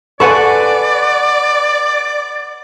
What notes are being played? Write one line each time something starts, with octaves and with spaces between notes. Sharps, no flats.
A4 B4 D5 F#5 G#5 C#6